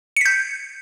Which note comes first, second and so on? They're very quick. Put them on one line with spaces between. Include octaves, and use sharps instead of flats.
C#7 B6 G6